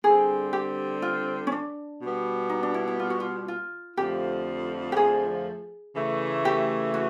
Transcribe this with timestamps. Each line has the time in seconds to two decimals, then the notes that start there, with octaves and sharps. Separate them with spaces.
0.04 D3 G3 C4 G#4
0.53 G4
1.02 F4
1.47 C#4
1.52 D4
2.00 B2 G3 B3
2.50 D#4
2.63 D4
2.74 E4
2.88 E4
2.99 F4
3.10 F#4
3.20 F4
3.48 F4
3.97 F2 D3 F3 A3 G4
4.92 G4
4.97 G#4
5.95 C#3 E3 A3
6.45 G4
6.94 F#4